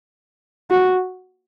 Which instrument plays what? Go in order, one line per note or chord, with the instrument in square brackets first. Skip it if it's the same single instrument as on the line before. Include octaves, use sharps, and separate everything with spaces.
[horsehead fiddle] F#4